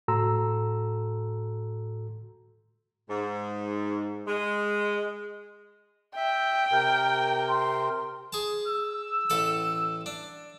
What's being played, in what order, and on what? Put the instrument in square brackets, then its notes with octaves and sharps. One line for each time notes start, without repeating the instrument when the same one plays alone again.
[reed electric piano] A2 F#4 A4 A#5 C6 E6
[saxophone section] G#2
G#3
[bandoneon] E5 [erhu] G5
[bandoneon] C3 A#4
[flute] C6
[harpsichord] G#4 A5
[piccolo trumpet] E6
[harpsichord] A1 A4 B5
D4